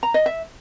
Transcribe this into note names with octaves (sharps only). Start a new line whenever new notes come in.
A#5
D#5
E5